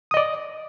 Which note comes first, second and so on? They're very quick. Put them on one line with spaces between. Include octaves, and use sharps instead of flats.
D#6 D#5 D5